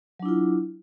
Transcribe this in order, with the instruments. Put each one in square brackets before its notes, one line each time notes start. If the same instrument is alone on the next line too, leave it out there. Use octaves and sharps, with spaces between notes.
[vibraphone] F#3
D4
E4
F4